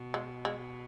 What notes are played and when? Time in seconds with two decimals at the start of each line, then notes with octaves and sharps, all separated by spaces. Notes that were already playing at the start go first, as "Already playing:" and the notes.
Already playing: B2
0.14 G#3
0.45 G#3